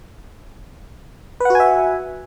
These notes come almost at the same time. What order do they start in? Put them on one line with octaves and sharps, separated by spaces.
B4 F#5 F#4 G#5 E5